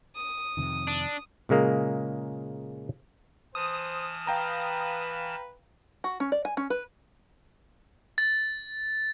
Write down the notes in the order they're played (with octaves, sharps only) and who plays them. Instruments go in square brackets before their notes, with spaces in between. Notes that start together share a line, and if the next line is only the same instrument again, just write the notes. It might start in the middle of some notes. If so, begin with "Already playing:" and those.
[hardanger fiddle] D#6
[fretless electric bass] F2 C3 D#3
[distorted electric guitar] D4
[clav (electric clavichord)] A#2 C#3 G#3 A#3
[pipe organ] E3 A5 F6 [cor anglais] C5 [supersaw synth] D#6
[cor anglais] B4 [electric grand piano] F5 G5 A#5
[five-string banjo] F#4
C#4
D5
G#5
C#4
B4
[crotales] A6